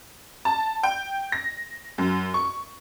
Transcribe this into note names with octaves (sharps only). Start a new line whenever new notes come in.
A5
G5
A#6
F#2
C#6